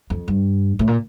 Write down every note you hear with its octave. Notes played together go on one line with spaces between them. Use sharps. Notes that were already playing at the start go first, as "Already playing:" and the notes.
F2
G2
A2
A#2